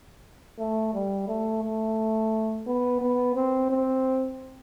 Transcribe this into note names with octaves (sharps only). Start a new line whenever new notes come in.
A3
G3
A3
A3
B3
B3
C4
C4